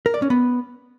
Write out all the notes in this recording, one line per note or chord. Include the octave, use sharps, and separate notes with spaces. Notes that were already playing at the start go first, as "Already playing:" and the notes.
A#4
D5
C#4
B3